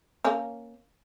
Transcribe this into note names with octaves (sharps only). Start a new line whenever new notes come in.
A#3 C#4